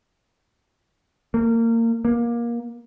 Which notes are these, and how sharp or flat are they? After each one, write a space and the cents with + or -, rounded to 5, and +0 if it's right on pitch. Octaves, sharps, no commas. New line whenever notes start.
A#3 -25
A#3 +20